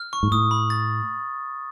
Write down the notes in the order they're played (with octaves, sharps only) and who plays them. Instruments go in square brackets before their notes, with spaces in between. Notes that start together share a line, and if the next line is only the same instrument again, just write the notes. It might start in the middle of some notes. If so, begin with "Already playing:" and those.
Already playing: [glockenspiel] F6
C#6
[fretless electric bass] G#2
[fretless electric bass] A2 [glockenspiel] D#6
[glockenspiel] B5
A6